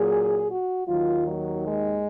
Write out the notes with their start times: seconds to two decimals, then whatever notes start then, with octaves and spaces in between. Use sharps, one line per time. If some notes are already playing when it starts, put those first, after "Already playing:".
Already playing: A#2 F#3 G#4
0.50 F#4
0.87 D#2 D#3 F#3 F4
1.25 F#3
1.64 G#3